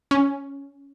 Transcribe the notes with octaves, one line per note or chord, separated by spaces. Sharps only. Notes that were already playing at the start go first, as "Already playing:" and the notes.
C#4